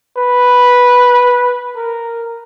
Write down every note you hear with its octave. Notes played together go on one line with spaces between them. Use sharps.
B4
A#4